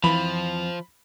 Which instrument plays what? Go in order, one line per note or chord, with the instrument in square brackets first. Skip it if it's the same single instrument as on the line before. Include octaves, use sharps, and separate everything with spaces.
[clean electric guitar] F2 [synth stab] E3 [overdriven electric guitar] F3 [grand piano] B5